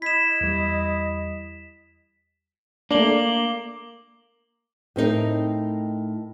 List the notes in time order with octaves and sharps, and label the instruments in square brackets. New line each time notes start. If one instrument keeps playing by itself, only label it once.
[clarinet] E4 [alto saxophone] D#5 [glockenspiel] B6 E7
[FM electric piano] E2 G3
[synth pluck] A3 D4 [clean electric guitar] A#3 [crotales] D6 F#7 G7
[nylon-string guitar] A2 C4 D#4 A#4